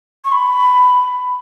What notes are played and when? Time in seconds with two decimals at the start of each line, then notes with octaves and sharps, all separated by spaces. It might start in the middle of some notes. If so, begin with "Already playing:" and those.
0.25 C#6
0.32 B5